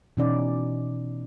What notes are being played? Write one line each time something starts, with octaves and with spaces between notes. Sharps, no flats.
B2 E3 C#4 D#4 D5